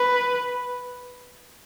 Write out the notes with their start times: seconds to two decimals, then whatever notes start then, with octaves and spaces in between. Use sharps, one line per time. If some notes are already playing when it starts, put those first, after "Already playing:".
Already playing: B4